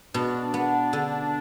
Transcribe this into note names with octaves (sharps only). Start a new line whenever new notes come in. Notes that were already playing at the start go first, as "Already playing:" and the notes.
B2 D4
B3
D3